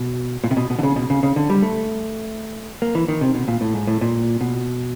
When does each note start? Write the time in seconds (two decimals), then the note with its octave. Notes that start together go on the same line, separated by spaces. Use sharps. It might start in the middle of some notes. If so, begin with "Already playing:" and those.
Already playing: B2
0.44 A#2
0.51 C3
0.57 B2
0.70 B2
0.79 D3
0.83 C#3
0.96 B2
1.10 C#3
1.23 C#3
1.36 D3
1.50 G3
1.62 A3
2.82 A#3
2.95 E3
3.08 D#3
3.21 C3
3.35 B2
3.48 A#2
3.61 A2
3.74 G#2
3.87 A2
4.01 A#2
4.41 B2